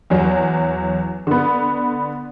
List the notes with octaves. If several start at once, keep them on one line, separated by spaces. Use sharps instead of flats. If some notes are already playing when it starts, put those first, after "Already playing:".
E2 F#3
D3 B3